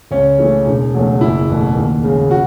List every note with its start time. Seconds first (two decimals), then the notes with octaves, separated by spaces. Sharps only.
0.11 C#2 C#4
0.38 C#3 E3 A3
0.66 E1
0.94 E2 C#3 F#3 A3
1.21 F#1 E4
1.49 E2 B2 A3
1.76 D#2
2.04 C#3 G#3
2.31 F#4